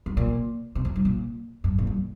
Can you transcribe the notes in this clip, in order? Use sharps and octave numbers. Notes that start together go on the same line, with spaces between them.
G2
A#2
C3
F2
G2
A#2
G2
A#2
G2